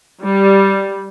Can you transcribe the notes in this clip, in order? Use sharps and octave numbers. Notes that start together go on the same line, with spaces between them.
G3